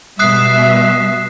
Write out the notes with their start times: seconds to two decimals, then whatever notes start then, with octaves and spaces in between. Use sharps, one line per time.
0.19 B2 G3 E5 D#6 F#6 C7